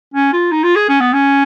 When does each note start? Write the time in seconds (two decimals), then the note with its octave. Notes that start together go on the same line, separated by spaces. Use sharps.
0.14 C#4
0.33 F4
0.51 D#4
0.63 F4
0.76 G#4
0.88 C#4
1.00 B3
1.13 C#4